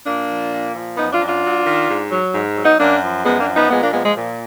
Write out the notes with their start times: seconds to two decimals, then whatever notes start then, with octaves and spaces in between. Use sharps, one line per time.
0.06 A#2 A#3 D4
0.29 F3
0.51 A#2
0.74 F3
0.97 F#2 B3 D#4
1.12 D4 F4
1.20 F#2
1.28 D4 F4
1.42 F#3
1.65 D#3
1.88 G#2
2.11 F#3
2.34 G#2
2.57 F#3
2.64 B3 D#4
2.79 F#2 A#3 D4
3.02 F3
3.25 F#2 G#3 B3
3.40 A#3 D4
3.48 F3
3.55 B3 D#4
3.70 A#2 G#3 B3
3.82 A#3 D4
3.93 F3 G#3 B3
4.05 G#3
4.16 A#2